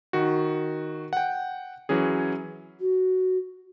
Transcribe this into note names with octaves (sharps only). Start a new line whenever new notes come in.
D#3 F#4
F#5 G5
E3 F#3 C#4 G#4
F#4